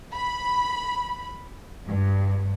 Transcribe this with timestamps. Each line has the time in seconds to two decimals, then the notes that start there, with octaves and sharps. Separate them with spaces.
0.13 B5
1.86 G2